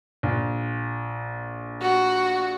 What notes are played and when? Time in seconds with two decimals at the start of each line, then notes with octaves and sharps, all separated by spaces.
0.23 A#1
1.81 F#4